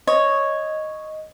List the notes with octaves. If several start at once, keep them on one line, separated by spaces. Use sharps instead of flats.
C#5 D#5